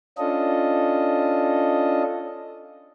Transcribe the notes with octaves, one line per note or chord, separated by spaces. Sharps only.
C#4 D4 F4 A4 D#5